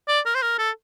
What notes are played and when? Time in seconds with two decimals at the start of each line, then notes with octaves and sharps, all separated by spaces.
0.08 D5
0.26 A#4
0.35 C5
0.42 A#4
0.58 A4